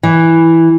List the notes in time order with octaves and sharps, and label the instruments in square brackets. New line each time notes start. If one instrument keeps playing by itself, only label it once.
[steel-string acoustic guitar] E3